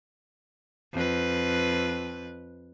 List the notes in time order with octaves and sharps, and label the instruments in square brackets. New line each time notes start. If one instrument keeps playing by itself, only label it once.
[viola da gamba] F2 B4